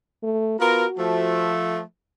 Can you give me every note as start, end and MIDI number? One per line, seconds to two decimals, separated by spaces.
0.23 0.59 57
0.60 0.85 59
0.60 0.85 65
0.60 1.53 66
0.60 0.85 70
0.98 1.81 53
0.98 1.81 57